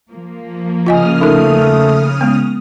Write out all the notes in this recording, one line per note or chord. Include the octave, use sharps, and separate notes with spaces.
F3 A#3
C#3 F4 D#5 G#5 D#6 F6
A3 D#4 A#4
G#3 B3